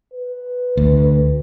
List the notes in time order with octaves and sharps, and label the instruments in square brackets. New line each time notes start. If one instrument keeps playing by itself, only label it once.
[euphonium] B4
[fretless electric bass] D2